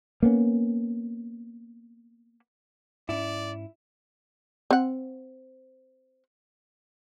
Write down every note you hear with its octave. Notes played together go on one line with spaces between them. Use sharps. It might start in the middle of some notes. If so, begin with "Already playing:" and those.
A#3 B3 C#4
G#2 C#4 E4 D5
C4 F#5